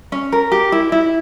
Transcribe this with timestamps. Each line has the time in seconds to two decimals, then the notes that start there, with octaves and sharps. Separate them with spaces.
0.12 C#4
0.32 A#4
0.52 G4
0.72 E4
0.92 E4